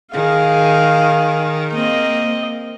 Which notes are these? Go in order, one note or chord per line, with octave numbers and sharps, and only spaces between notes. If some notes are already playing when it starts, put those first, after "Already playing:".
D#3 G#4 F5
A#3 C4 D#5